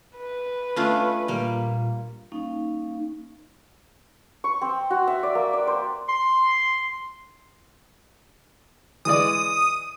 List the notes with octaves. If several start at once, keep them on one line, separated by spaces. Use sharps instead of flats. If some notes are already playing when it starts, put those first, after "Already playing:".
B4
A3 C#4 D4 F4
A#2 G3 A#3
G3 A#3 C#4 D#4 F5
C#6
C4
F#4
E5
D5
A#3
D5
C5
C6
E3 G#3 D5 D#6